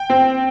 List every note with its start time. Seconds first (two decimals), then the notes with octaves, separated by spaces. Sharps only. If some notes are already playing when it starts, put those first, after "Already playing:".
Already playing: G5
0.10 C4